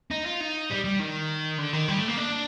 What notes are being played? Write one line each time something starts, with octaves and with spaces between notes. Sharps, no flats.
D#4
F4
D#4
G3
G3
D#3
D3
D#3
G3
A3
A#3
D4